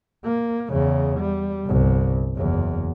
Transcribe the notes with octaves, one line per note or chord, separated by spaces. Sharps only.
A#3
E2 C#3
G3
G1 C2
F#1 E2